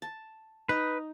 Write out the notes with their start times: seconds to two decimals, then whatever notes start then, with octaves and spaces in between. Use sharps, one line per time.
0.02 A5
0.69 D#4 B4